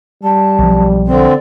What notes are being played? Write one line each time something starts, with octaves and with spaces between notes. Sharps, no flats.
G3 A5
B1 F3
D3 C4 D5